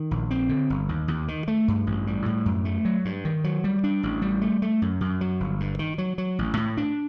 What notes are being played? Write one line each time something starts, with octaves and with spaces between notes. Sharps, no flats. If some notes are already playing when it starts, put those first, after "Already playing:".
Already playing: D#3
A#1
C4
D3
G1
D#2
D#2
D#3
A3
G2
A1
G3
A2
F#2
A3
F#3
G2
D#3
F#3
G3
D4
A1
G3
A3
A3
F#2
F#2
F#3
G1
G2
D#3
F#3
F#3
A1
A2
D4